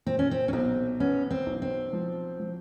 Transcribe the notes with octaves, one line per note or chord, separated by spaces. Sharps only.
A#2 C4
C#4
C4
C#4
B1 C4
B3 C#4
C4
B1
C4
F3
F3